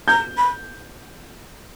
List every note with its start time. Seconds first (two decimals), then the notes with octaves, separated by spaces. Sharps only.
0.08 A#5 G6
0.37 B5